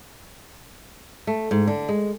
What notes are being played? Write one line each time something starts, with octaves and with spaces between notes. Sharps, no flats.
A3
G#2
D3
G#3